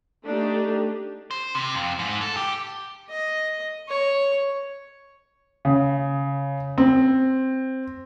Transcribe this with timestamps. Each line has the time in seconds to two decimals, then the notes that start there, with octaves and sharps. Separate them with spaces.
0.25 A3 D4 D#4 G4
1.31 C5
1.55 C3
1.75 F2
1.99 G#2
2.21 A4
2.37 G4
3.10 D#5
3.89 C#5
5.65 C#3
6.78 C4